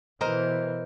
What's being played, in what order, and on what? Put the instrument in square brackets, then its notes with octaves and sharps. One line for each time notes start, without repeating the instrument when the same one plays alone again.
[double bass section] B2 E3 [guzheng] A#4 C5 D#5